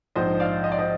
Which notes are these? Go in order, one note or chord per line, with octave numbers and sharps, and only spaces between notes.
A#1 G#2 F3 C5 D#5
D5 F5
D#5
D5
C5 D#5